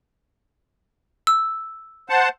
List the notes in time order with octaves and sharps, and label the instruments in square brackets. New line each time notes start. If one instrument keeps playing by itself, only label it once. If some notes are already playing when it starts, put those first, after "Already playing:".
[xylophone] E6
[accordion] C5 F#5 A5